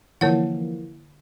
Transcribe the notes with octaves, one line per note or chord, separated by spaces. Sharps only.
D3 E3 F3 A#3 C#5 F#5